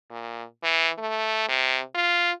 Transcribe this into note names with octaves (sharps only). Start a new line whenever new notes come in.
A#2
E3
A3
C3
F4